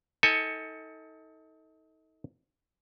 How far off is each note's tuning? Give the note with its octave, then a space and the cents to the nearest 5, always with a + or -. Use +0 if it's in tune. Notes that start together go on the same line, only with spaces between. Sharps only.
D#4 +35 A4 +15 G#5 +0